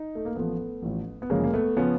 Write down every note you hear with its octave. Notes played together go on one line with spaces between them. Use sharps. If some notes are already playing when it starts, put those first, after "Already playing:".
Already playing: D#4
A3
A#3
A1 A2 F3 A3 B3
A1 A2 F3
B3
G1 F#2 C#3 F3 G#3 A#3
A#3
A3 B3
C#3 F3 B3 C#4